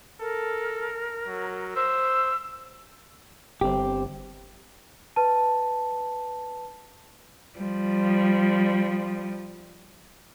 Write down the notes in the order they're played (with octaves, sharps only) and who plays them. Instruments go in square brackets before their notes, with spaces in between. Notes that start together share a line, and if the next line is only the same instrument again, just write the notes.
[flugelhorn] A4 [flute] A#4
[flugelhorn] F#3
[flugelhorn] C5 [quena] E6
[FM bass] G1 [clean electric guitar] C4 G4
[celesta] B4 A5
[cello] F3 G3